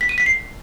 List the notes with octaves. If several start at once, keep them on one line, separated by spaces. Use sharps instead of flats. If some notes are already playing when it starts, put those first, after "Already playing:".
B6
D#7
B6
C7